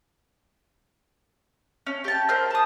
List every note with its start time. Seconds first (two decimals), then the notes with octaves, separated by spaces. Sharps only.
1.87 C#4
2.04 G4 A5
2.29 A#4 C5 E5 F6
2.51 A5 D#6